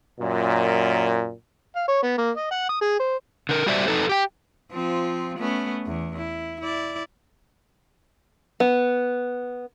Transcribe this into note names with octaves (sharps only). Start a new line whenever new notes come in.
F#2 A#2
F5
C#5
B3
A#3
D#5
F#5
D#6
G#4
C5
D3 A#4
G3 F#4 G4 C5 D5 E5
F2 D#4 A4 B4
G4 G5
F3 C4 F4
A3 B3 C#4
E2
E4
E4 D5
B3